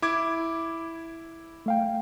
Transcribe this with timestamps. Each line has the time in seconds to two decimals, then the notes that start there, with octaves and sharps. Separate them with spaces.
0.02 E4 D6 G#6
1.66 A3 F5 G5